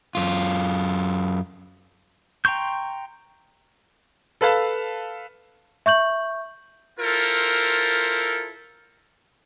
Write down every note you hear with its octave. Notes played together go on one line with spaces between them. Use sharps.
F#2 F4
G5 A#5 C6 C#6 G6
A4 B4 F5 A5
E5 C#6 G6 F#7
E4 F4 A4 A#4 C5